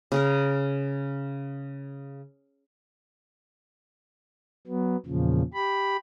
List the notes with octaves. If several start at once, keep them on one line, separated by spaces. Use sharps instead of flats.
C#3 G#4 A#4
F#3 B3
E2 A#2 C#3 F3
G4 B5